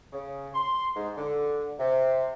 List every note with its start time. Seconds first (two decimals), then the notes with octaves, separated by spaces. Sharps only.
0.13 C#3
0.55 C6
0.96 G#2
1.17 D3
1.79 C3